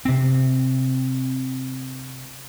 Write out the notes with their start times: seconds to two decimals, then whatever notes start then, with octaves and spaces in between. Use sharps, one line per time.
0.05 C3 C4